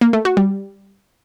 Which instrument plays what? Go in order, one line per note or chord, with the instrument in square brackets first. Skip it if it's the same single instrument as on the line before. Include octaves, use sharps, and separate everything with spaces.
[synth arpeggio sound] A#3
A3
F#4
G3